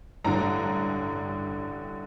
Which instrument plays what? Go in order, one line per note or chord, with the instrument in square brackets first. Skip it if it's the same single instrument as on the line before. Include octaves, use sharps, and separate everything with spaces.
[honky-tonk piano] A1 G2 D3 A#5